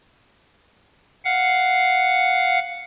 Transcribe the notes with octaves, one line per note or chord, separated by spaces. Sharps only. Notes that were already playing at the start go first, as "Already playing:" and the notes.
F5 F#5